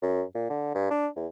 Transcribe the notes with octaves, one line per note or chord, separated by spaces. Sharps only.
F#2
A#2
D3
G2
D4
E2